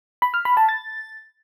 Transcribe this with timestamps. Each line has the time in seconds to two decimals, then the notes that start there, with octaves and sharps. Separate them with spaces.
0.22 B5
0.34 F6
0.45 B5
0.57 A5
0.69 A6